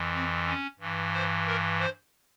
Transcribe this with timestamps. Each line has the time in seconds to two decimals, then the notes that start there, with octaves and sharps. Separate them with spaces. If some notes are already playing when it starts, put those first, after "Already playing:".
Already playing: F2 E3
0.14 C4
0.47 C#4
0.79 G2 E3
1.14 C5
1.46 A#4
1.79 C5